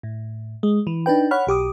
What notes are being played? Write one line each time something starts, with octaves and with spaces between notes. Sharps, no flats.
A2
G#3
E3
D4 D#4 B4 G5
C#5 F#5 B5 F6
B1 G4 D6 D#6